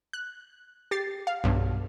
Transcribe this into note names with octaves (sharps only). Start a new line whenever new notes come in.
F#6
G4 A6 C7
F5
B1 G2